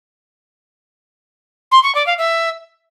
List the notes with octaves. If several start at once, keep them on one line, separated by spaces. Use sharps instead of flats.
C6
C#6
D5
F5
E5